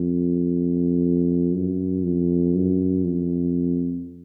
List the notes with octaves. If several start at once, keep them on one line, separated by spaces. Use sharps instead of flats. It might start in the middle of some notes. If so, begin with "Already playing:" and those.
Already playing: F2
F#2
F2
F#2
F2